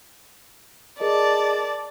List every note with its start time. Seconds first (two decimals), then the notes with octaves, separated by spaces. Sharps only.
1.00 G#4 A#4 D5 D#5 A5